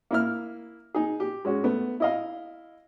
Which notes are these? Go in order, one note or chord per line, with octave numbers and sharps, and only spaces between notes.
A#3 E4 F6
D#4 G#4
G4
G#3 C#4 F#4
A3 B3
E4 D#5 F5